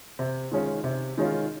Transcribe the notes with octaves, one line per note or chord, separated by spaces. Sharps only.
C3
D#3 G#3 C#4 F4
C3
D#3 G#3 C#4 F4